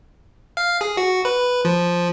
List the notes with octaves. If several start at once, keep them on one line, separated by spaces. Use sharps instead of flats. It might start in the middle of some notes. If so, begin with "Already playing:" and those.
F5
G#4
F#4
B4
F3